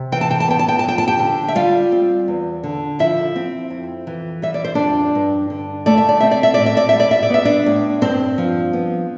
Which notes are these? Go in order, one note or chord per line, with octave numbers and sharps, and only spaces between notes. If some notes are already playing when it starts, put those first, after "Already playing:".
Already playing: C3
E3 G5
A5
G5
A5
B3 G5
A5
G5
A5
F2 G5
A5
G4 G5
D3
E5
G3 F4 F5
C4
E2
D3
F3 E4 E5
C4
F2
E3
G3 E5
D5
C5
F2 D4 D5
G2
D3
A3 D5
E5
D5
C4 E5
D5
E5
A2 D5
E5
D5
G3 E5
D5
E5
D5
B3 E5
D4 D5
A2
G2 C4 C5
F3
B3